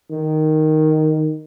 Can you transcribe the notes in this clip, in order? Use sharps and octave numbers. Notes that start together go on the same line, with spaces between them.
D#3